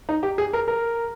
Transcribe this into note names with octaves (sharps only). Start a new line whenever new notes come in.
D#4
G4
G#4
A#4
A#4